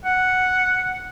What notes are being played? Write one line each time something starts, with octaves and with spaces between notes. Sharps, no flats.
F#5